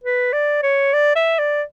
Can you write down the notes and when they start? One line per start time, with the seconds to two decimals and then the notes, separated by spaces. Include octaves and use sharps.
0.04 B4
0.33 D5
0.63 C#5
0.93 D5
1.16 E5
1.39 D5